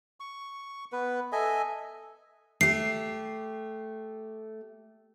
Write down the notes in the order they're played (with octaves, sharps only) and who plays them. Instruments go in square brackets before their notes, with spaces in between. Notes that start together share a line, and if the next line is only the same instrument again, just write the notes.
[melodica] C#6
B3 B4
A4 D#5 E5 G#5
[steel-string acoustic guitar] A3 G4 [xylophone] C7